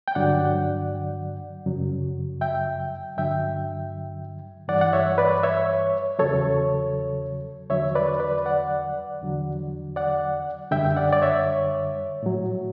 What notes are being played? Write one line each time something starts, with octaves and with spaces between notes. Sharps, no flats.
G5
G2 D3 F#3 D5 F#5
F#2 C#3 F#3
E5 G5
G2 D3 F#3 E5 G5
G2 E3 G3 D5 F#5
F#5
C#5 E5
B4 D5
C#5 E5
E2 C#3 F#3 A4 C#5
E2 D3 F#3 C#5 E5
B4 D5
B4 D5
D5 F#5
E2 D3 F#3
D5 F#5
F#2 D3 G3 E5 G5
D5 F#5
D5
C#5 E5
A2 F#3